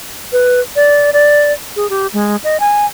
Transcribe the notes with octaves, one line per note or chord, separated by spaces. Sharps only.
B4
D5
D5
G#4
G4
G#3
D#5
G#5